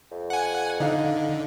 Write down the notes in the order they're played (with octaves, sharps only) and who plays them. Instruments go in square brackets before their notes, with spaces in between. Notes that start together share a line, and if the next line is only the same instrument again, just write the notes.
[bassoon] F2
[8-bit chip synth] F#5 G#5
[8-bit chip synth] D3 [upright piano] D#4 F5